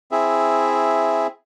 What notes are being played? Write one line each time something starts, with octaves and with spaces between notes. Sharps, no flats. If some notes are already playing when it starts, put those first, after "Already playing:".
C4 E4 G#4 E5